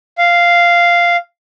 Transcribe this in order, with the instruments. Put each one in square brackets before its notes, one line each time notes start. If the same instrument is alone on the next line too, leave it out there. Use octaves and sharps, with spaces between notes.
[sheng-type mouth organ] F5